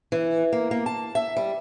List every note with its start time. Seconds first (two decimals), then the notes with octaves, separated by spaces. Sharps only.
0.12 E3
0.53 A#3
0.71 A#3
0.86 A5
1.15 E5
1.37 G3